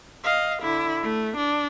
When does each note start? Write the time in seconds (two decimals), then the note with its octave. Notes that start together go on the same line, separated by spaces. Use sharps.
0.24 D#5 F5
0.63 D3 E4
1.03 A3
1.37 D4